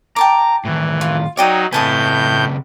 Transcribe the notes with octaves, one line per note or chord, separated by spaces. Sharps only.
G5 A5 A#5 D6
A2 D#3 E3
F4
F#3 D#4 C#5 D5 G5 D#6
A2 C#3 C4 B4 G#5 A5 D#6 G6